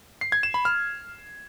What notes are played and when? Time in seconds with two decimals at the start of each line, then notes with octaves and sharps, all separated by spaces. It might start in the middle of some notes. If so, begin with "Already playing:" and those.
0.21 C7
0.32 G#6
0.43 E7
0.54 B5
0.65 F6